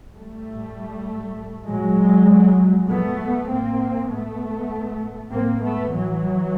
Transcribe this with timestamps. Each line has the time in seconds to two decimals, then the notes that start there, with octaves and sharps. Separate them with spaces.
0.16 G3 A3
0.46 A2
1.07 A2
1.67 A#2 F#3 G#3
2.28 A#2
2.88 A#2 A3 B3
3.49 A2 A#3 C4
4.09 A2 A3 B3
4.70 A2
5.31 A2 A#3 C4
5.61 A3 B3
5.91 A2 E3 F#3